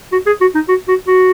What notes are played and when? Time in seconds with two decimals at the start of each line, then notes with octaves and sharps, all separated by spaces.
0.12 F#4
0.26 G#4
0.41 F#4
0.55 D#4
0.69 F#4
0.88 F#4
1.07 F#4